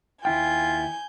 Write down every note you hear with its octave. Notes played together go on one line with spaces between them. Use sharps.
D#2 E4 F4 G5 G#5 G6